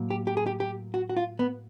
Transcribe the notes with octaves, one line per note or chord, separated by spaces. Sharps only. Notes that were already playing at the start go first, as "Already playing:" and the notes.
Already playing: A2 F#3 A#3
G4
G4
G#4
G4
G4
F#4
F#4
F4
B3